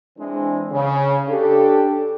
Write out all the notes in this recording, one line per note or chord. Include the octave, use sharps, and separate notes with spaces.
E3 G#3 C4 D4
C#3
D4 G4 A4